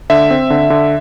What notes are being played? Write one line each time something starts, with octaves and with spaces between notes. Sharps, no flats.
D3 E5
C4
D3
D3